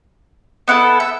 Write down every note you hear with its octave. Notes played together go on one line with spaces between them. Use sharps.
B3 E4 A4 F#5
E5